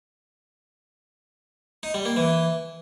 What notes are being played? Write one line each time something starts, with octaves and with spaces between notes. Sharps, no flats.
D#4
G3
A#3
E3